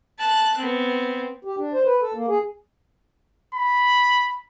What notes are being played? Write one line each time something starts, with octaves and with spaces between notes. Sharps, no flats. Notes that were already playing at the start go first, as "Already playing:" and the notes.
A5 F#6
B3 C4
G4
D4
C5
B4
A4
A#3
G#4
B5